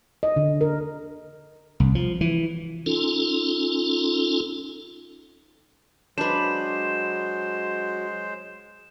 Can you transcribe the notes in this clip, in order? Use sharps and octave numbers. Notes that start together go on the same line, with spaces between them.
D#5
D3
A#4
C2
F3
E3
C#4 D#4 F4 A4
F#3 G#3 D4 B4 C5 E7